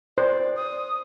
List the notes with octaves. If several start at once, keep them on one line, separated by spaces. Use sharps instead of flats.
C5 D5
D#6